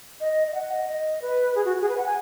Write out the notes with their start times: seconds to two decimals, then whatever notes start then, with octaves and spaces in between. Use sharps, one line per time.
0.21 D#5
0.47 D#5
0.55 F#5
0.72 D#5
0.89 D#5
1.22 B4
1.55 G#4
1.65 F#4
1.81 G#4
1.89 B4
1.97 F#5
2.06 G#5